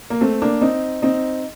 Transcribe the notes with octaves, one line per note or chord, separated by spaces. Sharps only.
A#3
A3 C4
A#3 D4
C4 D#4
C4 D#4